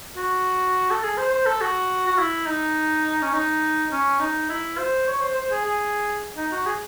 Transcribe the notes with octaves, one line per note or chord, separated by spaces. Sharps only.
F#4
A4
G#4
C5
C5
A4
F#4
F#4
E4
D#4
C#4
D#4
C#4
D#4
E4
C5
C#5
C5
C5
G#4
G#4
D#4
F#4
G#4